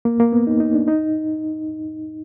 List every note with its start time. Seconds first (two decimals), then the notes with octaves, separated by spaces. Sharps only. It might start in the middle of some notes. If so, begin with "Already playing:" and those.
0.05 A#3
0.20 A#3
0.32 B3
0.47 D#4
0.60 D#4
0.74 D4
0.88 D#4